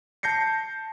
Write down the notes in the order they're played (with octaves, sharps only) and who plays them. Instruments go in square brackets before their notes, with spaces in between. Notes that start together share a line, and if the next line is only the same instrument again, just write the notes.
[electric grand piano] A5 G6 A#6 C7 C#7